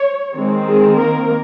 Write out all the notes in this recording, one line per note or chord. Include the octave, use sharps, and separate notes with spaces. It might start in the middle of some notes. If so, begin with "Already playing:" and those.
Already playing: C#5
D#3 G#3 C4
G#3 G#4
A#3 A#4